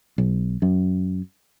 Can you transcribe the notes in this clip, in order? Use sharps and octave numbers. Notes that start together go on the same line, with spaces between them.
B1
F#2